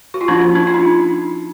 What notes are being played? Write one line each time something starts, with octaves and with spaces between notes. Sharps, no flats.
F#4
F4
F3 A#3 C#4 D4 E4
D4 E4
F4
E4
D#4